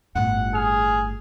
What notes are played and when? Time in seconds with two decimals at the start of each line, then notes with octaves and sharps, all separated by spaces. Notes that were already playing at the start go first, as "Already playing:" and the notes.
0.15 G1 A2 F#5
0.55 G#4 F6